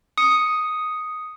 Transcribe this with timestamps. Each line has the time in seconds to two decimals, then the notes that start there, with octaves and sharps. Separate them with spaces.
0.18 D#6 C#7